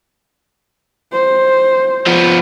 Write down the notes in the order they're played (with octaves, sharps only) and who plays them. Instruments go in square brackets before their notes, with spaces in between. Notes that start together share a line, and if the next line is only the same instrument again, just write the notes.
[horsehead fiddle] C5
[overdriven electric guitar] F3 B3